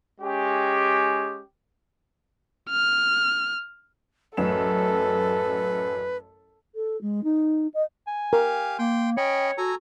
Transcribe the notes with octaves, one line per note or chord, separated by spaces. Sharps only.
G#3 C#4 G4
F6
A1 F#2 A4 B4 E7
A4
G#3
D#4
D#5
G#5
G4 A#4 F5
A#3 G5 C6
C#4 C#5 D#5 G5 B5
F#4 A4 G#5 A#5